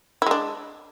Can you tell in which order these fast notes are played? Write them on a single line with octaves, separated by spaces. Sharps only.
E4 G#3 D4